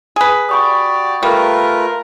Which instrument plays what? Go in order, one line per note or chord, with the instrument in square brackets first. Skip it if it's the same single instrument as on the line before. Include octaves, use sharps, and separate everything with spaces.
[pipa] G#4 B4
[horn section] F#4 G4 D5 [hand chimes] B5 C#6 D#6
[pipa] G3 [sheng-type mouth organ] A3 F4 B4 [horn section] A#4